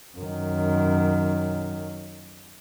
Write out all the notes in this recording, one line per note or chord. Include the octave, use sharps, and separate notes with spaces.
F#2 D#3